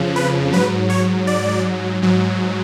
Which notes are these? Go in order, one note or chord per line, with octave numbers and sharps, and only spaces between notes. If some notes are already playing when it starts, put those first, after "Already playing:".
Already playing: F2 C#3 F3
B4
G#2 F#3 B4
C#5
D5
G#2 F#3